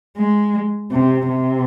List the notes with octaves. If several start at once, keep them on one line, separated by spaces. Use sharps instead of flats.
G#3
C3
C3